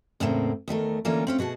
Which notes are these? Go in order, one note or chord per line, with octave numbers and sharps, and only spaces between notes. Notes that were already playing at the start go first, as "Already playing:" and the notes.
E2 A2 C#3 A#3 C4
E2 D#3 A3 A#4
D3 E3 A#3 C#4 F4 A#4
C4 C#4 F4
B2 F#4 G#4 A5